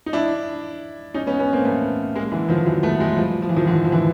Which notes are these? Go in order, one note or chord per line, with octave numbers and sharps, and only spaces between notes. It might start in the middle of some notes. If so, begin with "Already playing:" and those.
D#4
D4 E4
C#4 D#4
B3 C#4
B3 C#4
A#3 C4
A3 B3
G#3 A#3
D3 E3
D#3 F3
E3 F#3
A3 B3
F#3 G#3
F3 G3
F3
E3
D#3 F3
D3 E3
F3
D3 E3